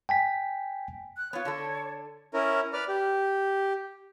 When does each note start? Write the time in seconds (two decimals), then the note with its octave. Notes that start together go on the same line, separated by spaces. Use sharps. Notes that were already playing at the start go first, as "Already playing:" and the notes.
0.09 G5 G#5 B6
1.17 F#6
1.33 B3 F4 C#5
1.45 D3 D4 A4
2.34 C#4 E4 A#4
2.73 B4 D5 F6
2.88 G4